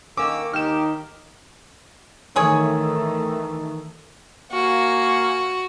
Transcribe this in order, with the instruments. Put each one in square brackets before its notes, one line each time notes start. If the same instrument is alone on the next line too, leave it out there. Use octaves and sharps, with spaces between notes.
[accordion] D#3 E6 [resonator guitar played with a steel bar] A#3 C#4 [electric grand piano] D6
[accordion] D#2 G4 G5 [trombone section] D#3 D#4 [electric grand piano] F6 E7
[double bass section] D#3 E3 A3 [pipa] F#3 G#4 C#5
[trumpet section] A#3 F5 G#5 [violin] F#4